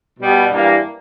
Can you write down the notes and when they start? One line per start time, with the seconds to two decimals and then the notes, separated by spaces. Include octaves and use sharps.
0.19 B2 G3 B3
0.50 G2 E3 G3 A#3